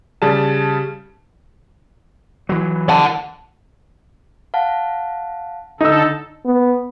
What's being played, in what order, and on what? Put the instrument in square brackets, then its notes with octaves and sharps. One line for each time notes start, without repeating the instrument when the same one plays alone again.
[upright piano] C#3 G3 A5
[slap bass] E3 F#3
[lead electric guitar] F#5 A5
[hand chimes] F5 F#5 A5
[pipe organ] D3 A4 [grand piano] D#4 E6
[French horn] B3